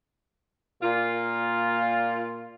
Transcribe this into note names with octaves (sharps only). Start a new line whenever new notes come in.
A#2 F4